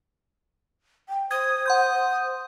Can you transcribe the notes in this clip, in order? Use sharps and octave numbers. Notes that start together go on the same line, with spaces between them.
G5
C5 D#6 G#6
F#5 C6 G6